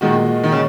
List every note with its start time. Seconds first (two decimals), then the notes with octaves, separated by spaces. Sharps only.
0.01 A#2 D#3 G#3 F#4
0.44 D#3
0.52 C#3